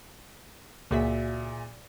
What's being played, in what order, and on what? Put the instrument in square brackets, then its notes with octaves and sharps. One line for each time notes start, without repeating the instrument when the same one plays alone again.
[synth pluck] C#2 F#4 B6 [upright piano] A#2 G#4 E5